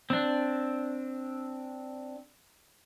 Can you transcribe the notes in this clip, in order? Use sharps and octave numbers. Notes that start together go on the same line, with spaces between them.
C4 D4